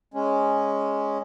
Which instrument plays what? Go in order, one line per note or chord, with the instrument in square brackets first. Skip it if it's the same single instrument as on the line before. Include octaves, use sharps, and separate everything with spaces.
[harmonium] G#3 C#4